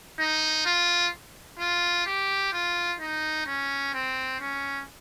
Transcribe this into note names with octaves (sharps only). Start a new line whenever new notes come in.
D#4
F4
F4
G4
F4
D#4
C#4
C4
C#4